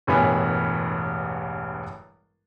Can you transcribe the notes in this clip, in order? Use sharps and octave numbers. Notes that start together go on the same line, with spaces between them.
E1 A1 G2 B3 G#5 B5